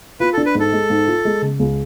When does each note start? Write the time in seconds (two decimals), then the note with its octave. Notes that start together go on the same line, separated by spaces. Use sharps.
0.20 F4 B4
0.33 A4
0.38 D4
0.46 B4
0.55 G#2 A4
0.72 G#3
0.90 G#2
1.07 F4
1.25 G#3
1.42 C#3
1.59 C#2